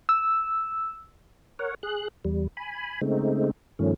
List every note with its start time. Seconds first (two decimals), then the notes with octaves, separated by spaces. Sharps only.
0.09 E6
1.59 A#4 C#5 F#5
1.83 G#4 F#6
2.25 E2 G3
2.57 G#5 B5
3.01 C#3 G#3 A3 C4 D#4
3.79 G2 D#3 F3 A3 C#4